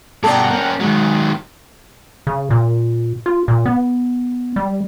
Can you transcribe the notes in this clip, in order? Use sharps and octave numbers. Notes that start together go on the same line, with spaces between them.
G2 B2 A4 D5 F#5 G5 A#5
A#3 C#4
D#3 F#3 G#3
C#3
A#2
F4
A#2
B3
G3